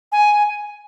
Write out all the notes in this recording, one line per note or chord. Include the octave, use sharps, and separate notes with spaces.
G#5